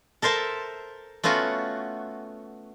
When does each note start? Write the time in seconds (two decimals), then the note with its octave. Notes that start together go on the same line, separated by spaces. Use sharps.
0.22 A4 A#4 C5 E5 A5
1.24 A3 B3 C#4 F4 F#4